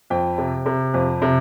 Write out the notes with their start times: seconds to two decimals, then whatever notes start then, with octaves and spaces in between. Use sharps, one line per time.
0.10 F2 G5
0.38 C3
0.66 C3
0.94 F2
1.22 C3